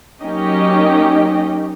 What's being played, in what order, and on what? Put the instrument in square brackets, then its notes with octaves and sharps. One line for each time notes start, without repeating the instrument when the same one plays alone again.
[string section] F#3 A#3 C#4 D#4 G4 D#5